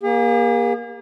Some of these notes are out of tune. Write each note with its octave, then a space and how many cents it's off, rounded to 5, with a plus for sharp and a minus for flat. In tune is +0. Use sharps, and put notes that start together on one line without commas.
A#3 +25 G#4 -40